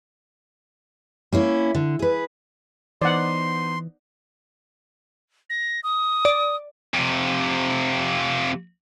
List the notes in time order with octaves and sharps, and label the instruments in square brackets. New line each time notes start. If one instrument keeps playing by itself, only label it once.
[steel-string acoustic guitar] A#3 C#4 E4
D3
G#4 B4
[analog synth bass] E3 [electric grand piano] B3 D#4 C5 [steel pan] D5 F#5 [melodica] C6
[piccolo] A#6
D#6
[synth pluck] D5
[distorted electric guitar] F2 C3